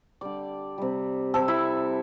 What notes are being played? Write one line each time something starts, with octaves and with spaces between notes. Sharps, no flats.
D3 G3 D5
C3 G3
C3 G3 A4
E4